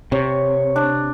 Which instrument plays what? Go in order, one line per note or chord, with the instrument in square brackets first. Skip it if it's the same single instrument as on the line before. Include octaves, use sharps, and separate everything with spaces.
[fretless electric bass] C3 [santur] C#5
[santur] D4